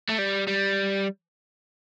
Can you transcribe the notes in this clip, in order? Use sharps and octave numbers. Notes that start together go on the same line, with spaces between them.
A3
G3
G3